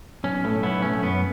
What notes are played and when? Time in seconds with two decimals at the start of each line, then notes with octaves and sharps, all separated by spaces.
0.24 B1 C#4
0.44 A2 A3
0.63 B1 B3 E4
0.82 A2 A3 C#4
1.02 F#2 B3